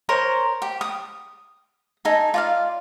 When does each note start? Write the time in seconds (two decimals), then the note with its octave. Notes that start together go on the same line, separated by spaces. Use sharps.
0.09 A#4 C5 C#5
0.62 G4
0.81 D#6
2.05 D#4 A4 G#5
2.34 F4 D5 F5